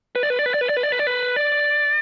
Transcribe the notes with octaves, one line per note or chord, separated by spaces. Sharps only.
B4
D5
B4
D5
B4
D5
B4
D5
B4
D5
B4
D5
B4
D5